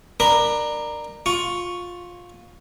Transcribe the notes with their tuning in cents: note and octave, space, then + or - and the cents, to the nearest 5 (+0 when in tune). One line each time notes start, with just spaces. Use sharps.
D4 +25 A#4 +0 B5 +0
F4 +15 C#6 +0